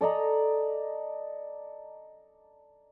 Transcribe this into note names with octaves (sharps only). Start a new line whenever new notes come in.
A4 D5 D#5 A#5